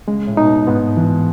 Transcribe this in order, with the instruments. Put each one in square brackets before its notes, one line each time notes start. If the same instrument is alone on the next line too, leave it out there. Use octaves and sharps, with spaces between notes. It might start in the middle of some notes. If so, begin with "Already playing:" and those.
[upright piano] C#3 [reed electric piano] G#3
[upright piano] A2
[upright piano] B2 [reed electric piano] D#4
[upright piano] G#2 [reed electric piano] B3
[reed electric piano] E3